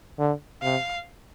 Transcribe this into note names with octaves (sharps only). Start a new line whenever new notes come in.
D3
C3 F5